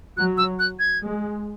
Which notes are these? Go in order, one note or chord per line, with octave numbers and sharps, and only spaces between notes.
F#3 F#6
E6
F#6
G#6
G#3